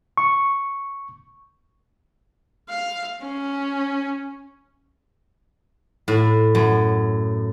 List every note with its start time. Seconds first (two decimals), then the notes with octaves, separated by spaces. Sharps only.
0.17 C#6
2.69 F5
3.22 C#4
6.08 A2
6.55 F#2